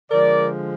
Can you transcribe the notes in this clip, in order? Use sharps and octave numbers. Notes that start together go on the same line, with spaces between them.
D3 F3 G#3 A#4 D5